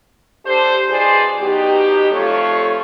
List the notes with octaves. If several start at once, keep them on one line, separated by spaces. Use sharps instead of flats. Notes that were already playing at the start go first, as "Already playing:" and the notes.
D4 G4 A4 C5
B2 E3 B3 G#4 C5 D5
B2 F#3 D#4 G4
F2 A3 F4 A4 C#5